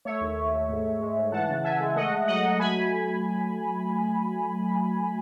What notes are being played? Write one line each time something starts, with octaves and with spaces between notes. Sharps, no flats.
A3 C#5 E5
D#2
D#2
A3
G#2
G#2
G#3
G#2
E3 F#5 A5
C#3
C#3 E5 G#5
G#3
A3 D#5 F#5
A3
F#3 D#5 F#5
F#3
A3 G#5 B5